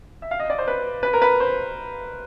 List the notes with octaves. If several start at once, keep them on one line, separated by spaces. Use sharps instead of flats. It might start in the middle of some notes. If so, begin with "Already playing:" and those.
E5
F5
D#5
D5
C5
B4
B4
A#4
B4
C5